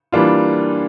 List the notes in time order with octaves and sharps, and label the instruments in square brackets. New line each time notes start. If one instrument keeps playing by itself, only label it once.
[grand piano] E3 G3 A#3 D4 F4